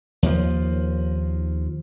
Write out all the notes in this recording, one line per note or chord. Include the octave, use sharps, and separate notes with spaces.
D#2 F3